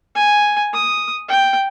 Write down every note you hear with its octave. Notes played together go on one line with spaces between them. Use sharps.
G#5
D#6
G5